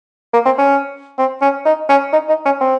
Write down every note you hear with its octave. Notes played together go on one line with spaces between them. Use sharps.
A#3
C4
C#4
C4
C#4
D#4
C#4
D#4
D#4
C#4
C4